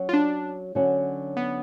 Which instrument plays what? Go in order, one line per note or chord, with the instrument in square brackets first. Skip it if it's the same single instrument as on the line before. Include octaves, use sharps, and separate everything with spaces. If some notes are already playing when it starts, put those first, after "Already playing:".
Already playing: [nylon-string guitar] F#3 C#4 F#4
[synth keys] F4
D4
[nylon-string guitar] D3 F#3 C#4 F#4
[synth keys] B3